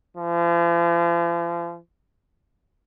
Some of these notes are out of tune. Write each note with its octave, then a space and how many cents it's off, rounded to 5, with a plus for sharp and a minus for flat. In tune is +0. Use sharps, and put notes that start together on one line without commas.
F3 -40